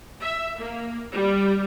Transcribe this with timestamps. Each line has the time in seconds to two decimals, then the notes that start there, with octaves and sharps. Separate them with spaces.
0.20 E5
0.58 A#3
1.13 G3